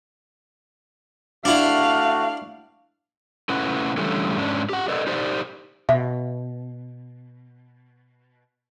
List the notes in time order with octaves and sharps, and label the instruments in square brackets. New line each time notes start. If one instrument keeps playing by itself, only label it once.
[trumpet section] A3 F#4 [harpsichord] D4 E4 [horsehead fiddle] F5
[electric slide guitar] A3 C#4 E4 B4 F#5
D3 E3 G3 A3 C#4
G#2 C#4 D4
G4 F#5
A4 B4 D5 D#5
D#4 G4 C5 D5
[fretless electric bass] B2 [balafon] E5